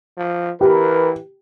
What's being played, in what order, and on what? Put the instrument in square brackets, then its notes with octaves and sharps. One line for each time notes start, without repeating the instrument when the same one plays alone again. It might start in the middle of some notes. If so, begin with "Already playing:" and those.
[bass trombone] F3
[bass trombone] E3 [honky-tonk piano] G4 [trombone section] A#4 B4